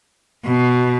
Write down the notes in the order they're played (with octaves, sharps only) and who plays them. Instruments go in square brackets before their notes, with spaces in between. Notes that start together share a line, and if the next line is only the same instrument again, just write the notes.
[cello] B2